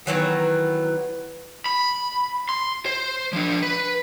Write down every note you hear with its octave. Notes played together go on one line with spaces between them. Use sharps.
D#3 E3 F#3 B3
B5
C6
C5
F3 D4
B4